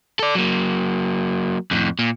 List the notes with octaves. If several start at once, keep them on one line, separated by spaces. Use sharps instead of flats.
A4 D5
F#3 A#3
F2 A2
A#2